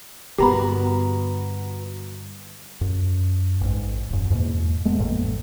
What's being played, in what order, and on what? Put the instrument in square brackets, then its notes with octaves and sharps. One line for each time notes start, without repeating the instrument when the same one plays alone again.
[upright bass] G2 D3 [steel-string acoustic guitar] B3 F#4 A#4 [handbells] G4 A#5 B5
[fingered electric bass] F#2
A1 G#2
E1 F#2
E2 G#2 B2 A#3
G#3 A3 B3
A1 F2 A2 A#3